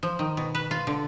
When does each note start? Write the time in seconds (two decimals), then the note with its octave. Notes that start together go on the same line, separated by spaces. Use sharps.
0.03 F3
0.19 D#3
0.37 B2
0.55 B4
0.71 F4
0.87 D3